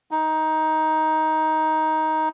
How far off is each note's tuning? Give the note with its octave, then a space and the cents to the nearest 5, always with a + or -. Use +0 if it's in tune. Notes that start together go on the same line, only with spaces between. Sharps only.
D#4 +15